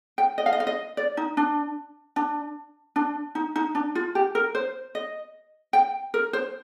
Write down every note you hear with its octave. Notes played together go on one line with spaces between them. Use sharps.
G5
D#5
F5
D#5
F5
D#5
D5
D#4
D4
D4
D4
D#4
D#4
D4
F4
G4
A#4
C5
D#5
G5
A#4
C5